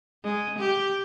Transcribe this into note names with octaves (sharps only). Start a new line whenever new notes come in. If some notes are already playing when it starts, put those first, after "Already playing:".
G#3
G4